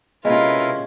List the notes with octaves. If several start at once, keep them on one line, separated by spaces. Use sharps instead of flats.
C3 G#3 C#4 E4 F4 A#4 B4